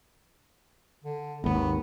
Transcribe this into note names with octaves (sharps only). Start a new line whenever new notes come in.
D3
G#1 D#2 B3